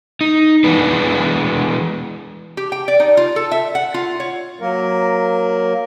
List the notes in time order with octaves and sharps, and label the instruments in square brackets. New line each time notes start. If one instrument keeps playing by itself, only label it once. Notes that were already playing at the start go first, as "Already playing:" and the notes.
[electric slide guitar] D#4
E3 G#3 B3 D4 B4
[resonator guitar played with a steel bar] G4
G5
D5
D#4
F4
A4
E5
F#5
F4
C#5
[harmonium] F#3 A#3 A#4